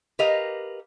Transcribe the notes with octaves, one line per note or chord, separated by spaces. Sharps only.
G4 A#4 B4 D#5 F5